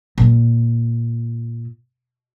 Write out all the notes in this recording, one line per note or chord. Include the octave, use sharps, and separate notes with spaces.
A#2 A#3